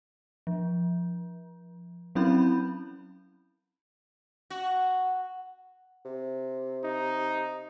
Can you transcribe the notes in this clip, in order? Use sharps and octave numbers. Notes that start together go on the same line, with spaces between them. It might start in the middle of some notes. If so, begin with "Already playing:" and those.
F3
F#3 C4 C#4 E4 B5 G6
F#4
C3
D#4